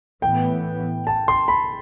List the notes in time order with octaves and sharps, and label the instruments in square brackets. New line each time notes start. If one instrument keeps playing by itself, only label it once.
[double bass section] A2 E3 B3 [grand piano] G5
[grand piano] A5
C6
B5